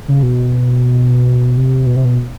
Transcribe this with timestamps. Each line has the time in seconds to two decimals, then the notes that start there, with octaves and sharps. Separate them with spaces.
0.08 C#3
0.23 B2
1.57 C3
1.86 B2
1.96 C3
2.05 B2